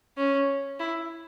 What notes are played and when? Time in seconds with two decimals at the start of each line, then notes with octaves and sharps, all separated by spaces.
0.17 C#4
0.80 E4